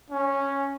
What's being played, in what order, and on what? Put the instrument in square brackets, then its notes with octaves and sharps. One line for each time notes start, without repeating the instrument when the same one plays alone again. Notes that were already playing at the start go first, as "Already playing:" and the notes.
[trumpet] C#4